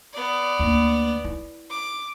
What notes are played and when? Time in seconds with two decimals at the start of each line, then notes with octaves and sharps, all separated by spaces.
0.13 B3 D5
0.59 D2 A#3
1.24 E4
1.69 D6